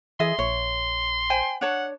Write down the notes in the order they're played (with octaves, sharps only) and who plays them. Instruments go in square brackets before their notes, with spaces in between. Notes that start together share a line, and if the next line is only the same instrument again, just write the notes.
[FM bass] E3 [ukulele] G#4 D#5 E5 [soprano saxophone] C6
[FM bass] A#1 [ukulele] C#5
[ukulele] C5 G5 G#5
[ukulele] D4 C#5 A5 [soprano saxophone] F#5